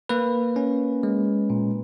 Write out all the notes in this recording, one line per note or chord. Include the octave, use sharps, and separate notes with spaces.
A#3 B4
C#4
G#3
A#2